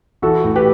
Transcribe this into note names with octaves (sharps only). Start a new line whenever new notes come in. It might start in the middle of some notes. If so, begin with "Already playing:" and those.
E3 F#4 A4
A2
G4 B4